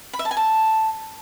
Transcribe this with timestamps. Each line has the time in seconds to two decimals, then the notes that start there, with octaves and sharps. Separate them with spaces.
0.13 B5
0.19 E5
0.25 A5
0.31 G#5
0.37 A5